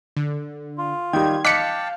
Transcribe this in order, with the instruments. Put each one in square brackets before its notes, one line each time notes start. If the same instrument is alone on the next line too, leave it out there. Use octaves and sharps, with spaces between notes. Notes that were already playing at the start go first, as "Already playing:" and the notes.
[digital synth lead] D3
[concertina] F4
[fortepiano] D#3 G3 [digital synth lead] G#6
[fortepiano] D#5 D6 F#6 [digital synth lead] F5 [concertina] G5 A5 [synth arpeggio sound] B6 C#7